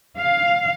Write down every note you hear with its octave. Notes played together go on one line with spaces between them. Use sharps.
F5